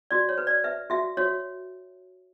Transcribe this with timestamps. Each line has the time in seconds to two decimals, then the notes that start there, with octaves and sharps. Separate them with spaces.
0.11 F#4 D5
0.29 C#5
0.38 B4
0.47 D5
0.64 B4 E5
0.90 F#4 E5
1.17 F#4 C#5